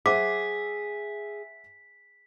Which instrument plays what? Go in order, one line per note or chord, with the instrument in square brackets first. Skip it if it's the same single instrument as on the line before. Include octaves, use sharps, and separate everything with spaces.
[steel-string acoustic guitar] G#4 [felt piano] C5 E5 F#5 [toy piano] D6 [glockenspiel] B6